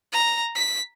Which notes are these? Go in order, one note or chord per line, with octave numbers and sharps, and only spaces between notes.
A#5
B6